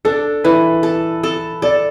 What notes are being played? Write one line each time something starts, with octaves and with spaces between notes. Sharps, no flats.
D4 A4
E3 B4
A4
A4
A4 D5